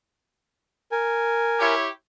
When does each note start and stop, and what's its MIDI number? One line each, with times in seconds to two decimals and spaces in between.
0.92 1.74 70
0.92 1.74 80
1.60 1.88 64
1.60 1.88 67
1.60 1.88 73